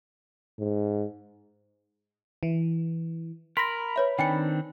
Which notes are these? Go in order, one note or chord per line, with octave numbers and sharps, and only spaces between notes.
G#2
E3
A#4 B5 C6 A#6
B4 C#5 E5
D#3 C4 D4 G5 G#5 C#7